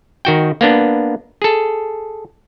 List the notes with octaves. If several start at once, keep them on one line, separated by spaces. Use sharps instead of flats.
D#3 F#4 G5
A#3 B3 D4
G#4 A4